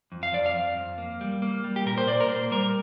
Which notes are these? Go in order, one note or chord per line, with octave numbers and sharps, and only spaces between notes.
F2
F5
F2 D5
F5
F2
F2
A#3
G3
A#3
G3
G4
A#2 A#4
C5
A#2 D5
A#4
A#3 C5
G3 A#4